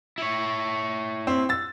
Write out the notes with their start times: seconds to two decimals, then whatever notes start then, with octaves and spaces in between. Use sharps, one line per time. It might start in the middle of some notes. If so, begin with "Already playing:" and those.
0.18 E4 C#5
1.27 C4
1.49 E6 A6